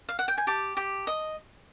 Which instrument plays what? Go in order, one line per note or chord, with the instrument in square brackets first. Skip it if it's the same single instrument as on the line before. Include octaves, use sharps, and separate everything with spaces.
[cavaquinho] F5
F#5
G5
G#5
G4 A5
G4
D#5